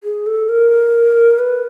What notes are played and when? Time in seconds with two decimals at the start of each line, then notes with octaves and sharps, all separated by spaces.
0.04 G#4
0.27 A4
0.49 A#4
1.39 B4